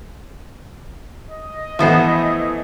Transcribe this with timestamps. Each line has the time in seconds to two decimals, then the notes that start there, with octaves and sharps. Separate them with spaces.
1.31 D#5
1.79 E3 F3 A3 B3 E4 C5